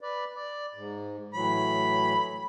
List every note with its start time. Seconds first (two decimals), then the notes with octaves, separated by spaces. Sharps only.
0.01 B4 D5
0.35 D5
0.74 G#2
1.34 A2 E3 F#3 B5